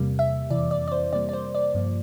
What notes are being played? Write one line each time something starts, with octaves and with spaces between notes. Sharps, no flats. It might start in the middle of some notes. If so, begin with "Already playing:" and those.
Already playing: E2 C3 G3 A#3
E5
F2 C3 E3 D5
D5
D5
C5
C3 G3 A#3 D5
D5
C5
D5
G2 F3 A#3